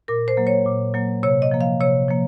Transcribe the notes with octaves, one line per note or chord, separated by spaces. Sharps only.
A#2 A#4
C5
F#3 A#3
C#5
A#2
F#3 A#3
C3 C#5
D#5
F3 A#3
F5
C3 C#5
F3 A#3